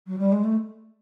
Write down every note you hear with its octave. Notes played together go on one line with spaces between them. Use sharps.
F#3
G3
G#3
A3